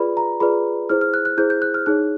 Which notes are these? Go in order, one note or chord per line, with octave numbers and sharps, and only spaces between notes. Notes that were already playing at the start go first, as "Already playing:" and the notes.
Already playing: F4 G#4 B4 D5 B5
A#5
F4 G#4 B4 D5 B5
E4 G#4 C5 F6
F6
F#6
F#6
E4 G#4 C5 G6
G6
F#6
F6
D#4 G#4 C#5 F#6